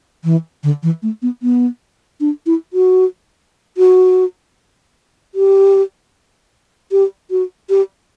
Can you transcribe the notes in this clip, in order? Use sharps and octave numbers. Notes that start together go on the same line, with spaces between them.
E3
D3
E3
A3
B3
B3
D4
E4
F#4
F#4
G4
G4
F#4
G4